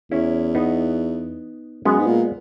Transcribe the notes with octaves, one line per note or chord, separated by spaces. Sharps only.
E2 C#4 E4
B3 D#4
F#2 G#3 B3
G#2
A#2